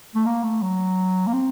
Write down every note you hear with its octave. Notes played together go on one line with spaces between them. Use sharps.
A3
A#3
A3
F#3
A#3
C4